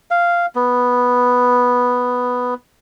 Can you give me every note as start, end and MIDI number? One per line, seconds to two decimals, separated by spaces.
0.11 0.46 77
0.55 2.54 59